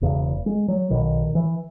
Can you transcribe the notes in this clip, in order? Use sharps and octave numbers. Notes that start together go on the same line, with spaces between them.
E1 E2 C#3
G#3
F#3
B1 B2 D#3
E3